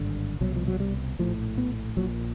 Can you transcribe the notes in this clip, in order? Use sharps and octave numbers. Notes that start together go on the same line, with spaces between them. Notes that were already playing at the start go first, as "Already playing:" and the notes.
Already playing: G#1 G2 D3
C2 B2 F#3
F3
F#3
G3
A#1 A2 F3
B3
A#1 A#2 F#3